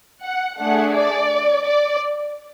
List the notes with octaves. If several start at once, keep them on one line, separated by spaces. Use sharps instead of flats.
F#5
A3 D4 G#4 F#5
D5
D5